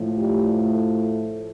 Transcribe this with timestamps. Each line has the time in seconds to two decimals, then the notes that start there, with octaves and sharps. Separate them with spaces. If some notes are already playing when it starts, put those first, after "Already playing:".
Already playing: A2 F3
0.16 G3
0.53 A3